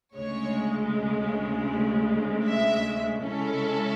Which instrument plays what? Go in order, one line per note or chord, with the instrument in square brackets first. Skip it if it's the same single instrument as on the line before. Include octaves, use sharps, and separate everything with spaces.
[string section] D2 C#3 G#3 C#5
E5
C#3 G#3 C#4 E4 A4